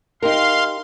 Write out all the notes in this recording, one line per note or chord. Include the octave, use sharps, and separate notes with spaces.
D#4 G4 A#4 F5 C6